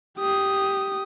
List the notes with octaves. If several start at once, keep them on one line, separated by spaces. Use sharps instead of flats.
G4 D#6